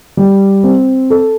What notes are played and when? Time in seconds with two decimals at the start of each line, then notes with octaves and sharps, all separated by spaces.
0.17 G3
0.64 C4
1.10 A4